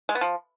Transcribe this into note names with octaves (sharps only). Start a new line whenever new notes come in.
G#3
B3
F3